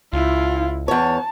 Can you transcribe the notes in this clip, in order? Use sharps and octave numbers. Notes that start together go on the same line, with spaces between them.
C#2 E4 F4
E2 C#5 A5